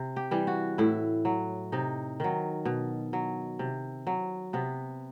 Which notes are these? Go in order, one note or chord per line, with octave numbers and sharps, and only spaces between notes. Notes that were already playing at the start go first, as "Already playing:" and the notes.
Already playing: C3
G4
E3 G3
F#4
A2 E4
F#3
C3 D#4
D#3 F#3
B2
F#3
C3
F#3
C3 B3